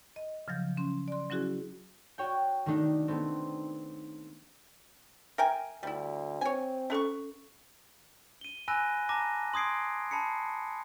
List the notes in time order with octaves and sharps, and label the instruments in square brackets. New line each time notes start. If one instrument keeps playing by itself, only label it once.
[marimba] D#5
C#3 F3 F#3 G6
C#4 C6
D5 C6
F#3 C#4 E4 F#4 G#4
[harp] F#4 C#5 G5
D#3 A3 D4 D#4
A3 B3 C4
[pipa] A#4 G5 G#5 [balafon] E5
[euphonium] D2 [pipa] G3 E4
[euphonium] C4 [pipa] C#5 G#5
[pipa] A3 C#6 [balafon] C#4 A4
[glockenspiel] D#7 G7
G#5 B5 E6 F#6 A#6 D#7
A5 A#5 D6 A#6 D#7
C6 D#6 G#6 C7 D7
A5 B5 C7 C#7